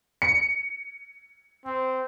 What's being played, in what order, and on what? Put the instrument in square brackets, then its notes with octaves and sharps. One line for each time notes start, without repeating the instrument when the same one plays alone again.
[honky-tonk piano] C#7
[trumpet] C4